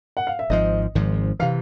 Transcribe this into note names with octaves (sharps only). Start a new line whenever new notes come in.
F#5
F5
E5
G#1 G#2 F3 D#5
G#1 G#2 F3
C3 E3 F5